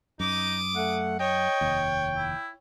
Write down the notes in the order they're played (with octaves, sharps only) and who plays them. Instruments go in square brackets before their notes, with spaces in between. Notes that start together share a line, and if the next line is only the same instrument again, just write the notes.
[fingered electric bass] F#2 [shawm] D#4 [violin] D6 D#6
[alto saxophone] A3 [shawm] F#5
[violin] C#5 [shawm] D#5 [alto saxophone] G5
[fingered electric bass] F1 D#2
[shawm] E4